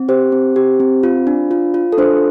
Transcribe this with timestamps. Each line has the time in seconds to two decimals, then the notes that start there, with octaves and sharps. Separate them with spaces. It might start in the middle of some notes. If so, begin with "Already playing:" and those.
Already playing: C4
0.09 G4 C5
0.32 C4
0.56 G4
0.80 C4
1.03 F4
1.27 D4
1.51 F4
1.74 F4
1.93 A4
1.98 D4 C5